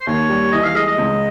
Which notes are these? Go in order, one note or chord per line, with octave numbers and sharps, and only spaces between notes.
C5
D#2 C#5
G3
E3 D#5
F5
G#3 D#5
D#5
C#2